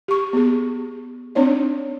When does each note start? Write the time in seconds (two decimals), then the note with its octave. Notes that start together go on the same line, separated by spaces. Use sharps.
0.08 G4 C#6
0.33 B3 G#4
1.35 C4 D4 D#4 C#5 D5